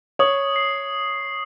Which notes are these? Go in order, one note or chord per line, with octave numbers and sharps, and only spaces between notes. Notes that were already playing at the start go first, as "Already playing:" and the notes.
C#5 D#6
C7